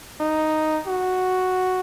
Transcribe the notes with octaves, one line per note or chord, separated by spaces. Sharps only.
D#4
F#4